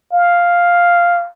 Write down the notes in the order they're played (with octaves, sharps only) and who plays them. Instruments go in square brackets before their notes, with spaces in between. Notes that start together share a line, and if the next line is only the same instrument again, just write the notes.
[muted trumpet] F5